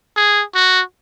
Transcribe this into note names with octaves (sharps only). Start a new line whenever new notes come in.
G#4
F#4